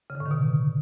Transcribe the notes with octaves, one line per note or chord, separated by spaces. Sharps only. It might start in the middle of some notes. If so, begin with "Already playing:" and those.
C#3
D3
A2
D#3
B2